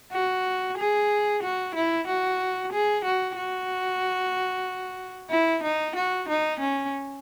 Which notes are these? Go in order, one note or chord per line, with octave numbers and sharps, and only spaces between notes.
F#4
G#4
F#4
E4
F#4
G#4
F#4
F#4
E4
D#4
F#4
D#4
C#4